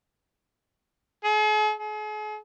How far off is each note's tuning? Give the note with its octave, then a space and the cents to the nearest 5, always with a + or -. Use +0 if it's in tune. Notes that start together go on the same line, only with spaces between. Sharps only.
G#4 +45
G#4 +40